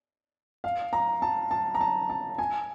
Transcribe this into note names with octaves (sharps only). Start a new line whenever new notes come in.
F5
A#5
A5
A5
A#5
A5
A5
G#5